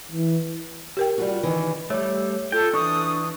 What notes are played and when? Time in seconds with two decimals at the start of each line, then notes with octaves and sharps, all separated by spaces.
0.12 E3
0.97 G4 A#4 G5
1.18 G3 F4 F#4
1.43 D#3 E3
1.90 G3 A3 C#5
2.52 F4 A4 G5
2.74 E3 D4 C#6 D#6